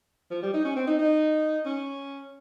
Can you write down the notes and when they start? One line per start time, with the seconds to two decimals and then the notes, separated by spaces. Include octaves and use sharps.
0.31 F3
0.42 G3
0.54 D#4
0.65 C#4
0.76 C4
0.87 D#4
0.99 D#4
1.65 C#4